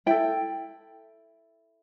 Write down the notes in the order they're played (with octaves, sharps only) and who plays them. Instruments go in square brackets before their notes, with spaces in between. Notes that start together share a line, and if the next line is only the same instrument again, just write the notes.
[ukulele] E4 A4 G5